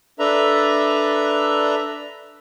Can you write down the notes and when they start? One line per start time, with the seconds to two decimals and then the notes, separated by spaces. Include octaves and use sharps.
0.19 D4 A4 B4 E5 A#5